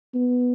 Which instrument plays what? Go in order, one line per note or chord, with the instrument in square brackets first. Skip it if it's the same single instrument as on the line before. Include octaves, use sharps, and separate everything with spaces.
[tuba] B3